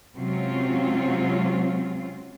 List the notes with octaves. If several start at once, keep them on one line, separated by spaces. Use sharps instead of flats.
C3 F#3 G#3 C4 C#4 F4